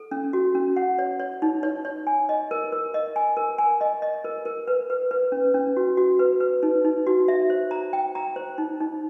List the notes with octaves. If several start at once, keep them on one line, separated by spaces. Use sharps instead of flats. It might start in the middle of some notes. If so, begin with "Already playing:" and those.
Already playing: A4
C#4
F#4
C#4
F#5
C#5
C#5
D#4
C#5
C#5
G#5
D#5
A#4
A#4
D#5
G#5
A#4
G#5
D#5
D#5
A#4
A#4
B4
B4
B4
C#4
C#4
F#4
F#4
B4
B4
D#4
D#4
F#4
E5
C5
A#5
G5
A#5
C5
D#4
D#4